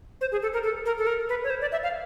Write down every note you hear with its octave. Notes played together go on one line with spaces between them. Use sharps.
C5
G#4
A4
A#4
A4
A#4
A4
A#4
B4
C#5
C5
D5
E5
F5